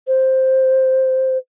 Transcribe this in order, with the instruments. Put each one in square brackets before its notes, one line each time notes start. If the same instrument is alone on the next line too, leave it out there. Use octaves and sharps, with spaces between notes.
[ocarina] C5